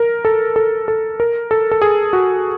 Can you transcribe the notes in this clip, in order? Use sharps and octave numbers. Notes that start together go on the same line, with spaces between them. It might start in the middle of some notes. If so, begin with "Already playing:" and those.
Already playing: A#4
A4
A4
A4
A#4
A4
A4
G#4
F#4